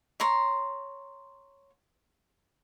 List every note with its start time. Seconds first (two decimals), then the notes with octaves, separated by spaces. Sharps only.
0.20 C#5 A#5 C6